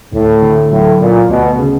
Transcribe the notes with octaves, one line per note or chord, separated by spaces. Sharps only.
D2 A2
D3
A2 F#3
A#2 B3
D2 B2
C#3